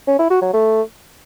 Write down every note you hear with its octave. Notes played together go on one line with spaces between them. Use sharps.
C#4
E4
F#4
F#3
A3